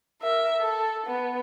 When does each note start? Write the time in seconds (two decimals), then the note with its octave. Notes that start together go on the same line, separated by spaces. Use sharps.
0.21 A#4 E5
0.60 A4
1.06 B3